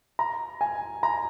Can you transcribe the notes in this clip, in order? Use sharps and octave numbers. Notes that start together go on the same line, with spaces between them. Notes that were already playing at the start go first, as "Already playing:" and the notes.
A#5
G#5
A#5